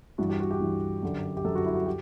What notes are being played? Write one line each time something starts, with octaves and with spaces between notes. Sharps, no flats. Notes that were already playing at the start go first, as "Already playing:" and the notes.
G2 E3 F#4
G4
F#4
G4
G2 E3
F#2 D3
G4
F#2 D3 A4
F#4
E4
F#4
G4